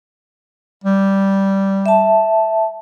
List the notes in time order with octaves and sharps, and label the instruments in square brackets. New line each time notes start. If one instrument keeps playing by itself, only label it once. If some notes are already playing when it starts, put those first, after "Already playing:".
[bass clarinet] G3
[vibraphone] E5 A5